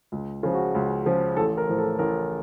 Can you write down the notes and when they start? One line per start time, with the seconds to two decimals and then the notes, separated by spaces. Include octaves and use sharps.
0.12 C#2
0.43 C#3 F3
0.54 F#4
0.75 C#2
1.06 C#3 F3
1.37 A1 A4
1.58 A#4
1.68 A2 F3
1.78 A4
1.99 A1 A#4